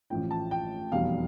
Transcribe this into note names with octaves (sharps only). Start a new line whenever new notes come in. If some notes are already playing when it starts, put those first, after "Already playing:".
A1 A2 F3 G5
A5
G5
F1 E2 B2 G3 F5